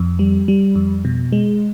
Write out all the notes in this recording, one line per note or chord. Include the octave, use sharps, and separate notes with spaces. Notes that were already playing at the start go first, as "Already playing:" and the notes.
Already playing: F2
G3
G3
F2
B2
G#3